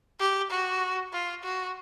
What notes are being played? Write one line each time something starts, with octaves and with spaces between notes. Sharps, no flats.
G4
F#4
F4
F#4